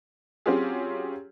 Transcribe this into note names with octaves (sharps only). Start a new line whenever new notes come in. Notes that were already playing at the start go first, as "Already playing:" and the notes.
F#3 C4 C#4 F4 G4 G#4